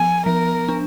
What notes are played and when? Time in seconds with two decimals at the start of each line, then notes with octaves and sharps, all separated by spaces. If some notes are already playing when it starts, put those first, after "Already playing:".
Already playing: F3 B3 G#5
0.26 F3 A#4
0.68 D4